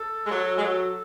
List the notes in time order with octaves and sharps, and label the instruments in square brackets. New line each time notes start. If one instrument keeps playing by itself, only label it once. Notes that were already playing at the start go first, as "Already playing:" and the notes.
Already playing: [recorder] A4
[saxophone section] G#3
F#3
G#3
F#3